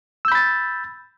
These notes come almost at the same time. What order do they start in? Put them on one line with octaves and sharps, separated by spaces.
E6 G6 B5 A6